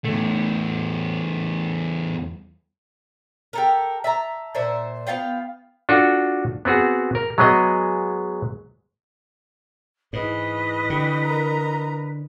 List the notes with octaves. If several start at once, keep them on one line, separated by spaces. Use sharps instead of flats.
E2 A3
G4 A4 A#4
E5 A5 A#5
A#2 C5 E5
B3 F4 F5 G5
D4 F4 F#4 A4 F#5
B3 C4 F#4 G#4
A#4
F#3 G#3 B3 G#4 D#5
G#2 E3 B4 D#5
D3 G4
A#4 A#5